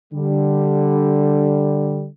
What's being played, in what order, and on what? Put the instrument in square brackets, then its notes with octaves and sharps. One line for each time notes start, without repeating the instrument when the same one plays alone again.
[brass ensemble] D3 G3